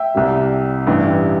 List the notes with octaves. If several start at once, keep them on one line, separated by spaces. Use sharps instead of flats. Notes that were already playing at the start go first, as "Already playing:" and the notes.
Already playing: E5 G5
C2 C3 G3
A1 G2 E3 G3